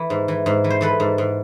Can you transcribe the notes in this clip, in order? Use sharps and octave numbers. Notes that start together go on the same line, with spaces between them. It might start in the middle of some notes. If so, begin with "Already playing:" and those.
Already playing: E3
G#2
E3
G#2
E3
C5
E3 A4 B4
G#2
G#2